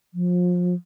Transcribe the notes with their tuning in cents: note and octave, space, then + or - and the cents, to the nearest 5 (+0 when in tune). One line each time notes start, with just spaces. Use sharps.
F3 +30